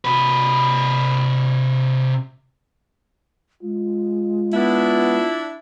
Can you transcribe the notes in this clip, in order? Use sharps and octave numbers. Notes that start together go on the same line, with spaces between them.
C3 B4
G#3 F4
B3 D4 E4